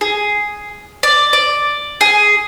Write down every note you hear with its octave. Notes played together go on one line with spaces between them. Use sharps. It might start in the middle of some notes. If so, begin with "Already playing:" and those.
G#4
D5
D5
G#4